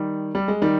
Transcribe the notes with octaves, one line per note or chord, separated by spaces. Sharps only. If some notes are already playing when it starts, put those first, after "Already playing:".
Already playing: D#3 G3
G3
G#3
D#3 G3